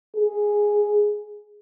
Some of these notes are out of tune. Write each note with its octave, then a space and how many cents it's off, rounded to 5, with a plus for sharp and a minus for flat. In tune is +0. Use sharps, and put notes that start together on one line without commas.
G#4 +0